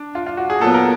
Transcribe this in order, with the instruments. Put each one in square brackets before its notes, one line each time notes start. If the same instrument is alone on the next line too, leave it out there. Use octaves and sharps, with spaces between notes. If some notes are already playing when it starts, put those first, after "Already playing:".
Already playing: [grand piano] D4
F4
F4
F#4
G#4
[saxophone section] A#2 F#3 B3 [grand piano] A4
[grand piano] A#4